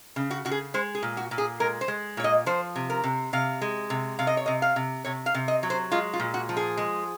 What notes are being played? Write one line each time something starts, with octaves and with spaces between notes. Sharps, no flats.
C#3
F#4
C#3 F#4
G#4
G#3 C5
G#4
A#2
F#4
A#2
G#4
G#3 A#4
C5
G#3
A#2 C#5
D#5
F3 C5
C3
A#4
C3
C3 F5
G#3
C3
C3 F5
D#5
C#5
C3 D#5
F5
C3
C3 C#5
F5
C3
D#5
F#3
C5
G#3 F4
F4
A#2
F#4
F3
G#4
G#3